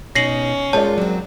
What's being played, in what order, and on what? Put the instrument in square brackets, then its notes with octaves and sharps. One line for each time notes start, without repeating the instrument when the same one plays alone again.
[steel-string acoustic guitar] B2 D#4 [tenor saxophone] C#4 [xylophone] A#6 C7 F#7
[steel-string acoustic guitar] G2 D#4 F4 [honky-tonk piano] G#3 A#4 D5 [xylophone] C#5 A5
[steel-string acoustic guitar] F#3 C4